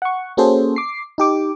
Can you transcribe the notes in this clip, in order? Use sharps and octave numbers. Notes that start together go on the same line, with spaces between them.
F#5 C#6
A#3 C#4 F#4 G#4 A4 C5
D6 C7
D#4 G4 D6